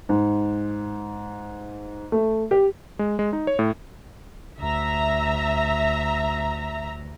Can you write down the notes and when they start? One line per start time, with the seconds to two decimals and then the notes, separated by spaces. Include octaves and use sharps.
0.09 G#2
2.12 A3
2.51 G4
2.99 G#3
3.19 G#3
3.33 D#4
3.47 C#5
3.59 A2
4.59 D2 E5 A#5